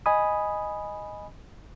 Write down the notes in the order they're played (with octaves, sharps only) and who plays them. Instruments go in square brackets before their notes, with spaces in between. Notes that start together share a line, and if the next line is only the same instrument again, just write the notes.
[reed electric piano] D#5 G#5 B5 D#6